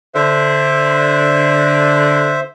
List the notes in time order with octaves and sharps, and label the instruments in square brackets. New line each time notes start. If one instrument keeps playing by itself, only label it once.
[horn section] D3 [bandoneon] C5 E5